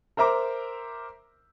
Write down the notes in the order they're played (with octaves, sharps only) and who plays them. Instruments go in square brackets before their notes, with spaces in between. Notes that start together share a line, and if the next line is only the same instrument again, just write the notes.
[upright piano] A#4 C5 E5 A#5 D6